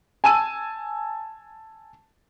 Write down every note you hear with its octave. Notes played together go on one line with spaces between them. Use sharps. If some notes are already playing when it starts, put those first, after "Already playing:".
G#5 A5 E6 D#7